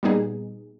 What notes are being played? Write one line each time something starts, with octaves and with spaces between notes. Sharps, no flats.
A#2 G3 B3 D#4 G#4